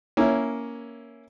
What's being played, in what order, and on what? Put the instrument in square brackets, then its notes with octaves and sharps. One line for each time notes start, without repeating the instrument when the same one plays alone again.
[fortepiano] A#3 C#4 E4